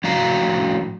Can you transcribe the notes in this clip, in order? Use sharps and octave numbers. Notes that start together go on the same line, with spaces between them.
A2 F3 F#4 F5 A#5